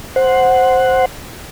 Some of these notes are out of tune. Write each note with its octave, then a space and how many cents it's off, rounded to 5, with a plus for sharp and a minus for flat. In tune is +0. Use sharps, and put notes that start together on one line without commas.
C5 +0 F#5 +0